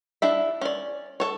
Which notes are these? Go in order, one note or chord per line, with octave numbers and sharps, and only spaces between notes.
D4 E4 E5
C#4 D5
A4 C#5